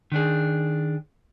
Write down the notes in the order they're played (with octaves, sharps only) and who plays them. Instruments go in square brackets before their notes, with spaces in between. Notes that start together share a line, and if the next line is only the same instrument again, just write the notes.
[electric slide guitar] D#3 D4 G#4